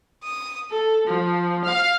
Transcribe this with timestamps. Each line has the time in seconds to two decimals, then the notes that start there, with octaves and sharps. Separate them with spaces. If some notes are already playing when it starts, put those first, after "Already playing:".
0.24 D#6
0.70 A4
1.06 F3
1.63 F5